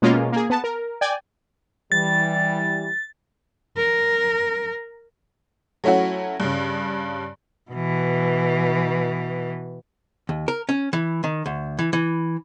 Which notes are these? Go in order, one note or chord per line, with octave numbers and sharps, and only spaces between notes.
B2 G#3 A#3 C#4 F4
A#3 G#4
B3 A5
A#4
D5 G5 G#5
E3 G3 A6
A#4
F#3 A3 C#4 E4 F#4
G2 C#3
B2 E3
D#2
A#4
C#4
E3
D#3
D2
E3
E3